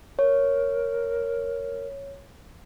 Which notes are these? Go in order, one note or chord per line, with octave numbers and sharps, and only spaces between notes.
A#4 C#5